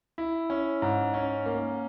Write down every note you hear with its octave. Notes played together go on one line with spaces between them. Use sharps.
E4
C#4
G#2
C#4
A#3